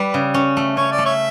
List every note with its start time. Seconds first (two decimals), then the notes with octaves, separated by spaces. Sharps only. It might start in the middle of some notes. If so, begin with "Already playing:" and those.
Already playing: G3 B4
0.14 C#3
0.34 C#4
0.57 A3
0.77 C#4 C#5
0.92 D5
0.98 A3
1.06 C#5 E5